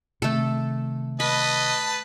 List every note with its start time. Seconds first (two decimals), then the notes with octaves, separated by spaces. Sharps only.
0.22 C3 D#3 A3 A4
1.20 B4 D#5 A5 B5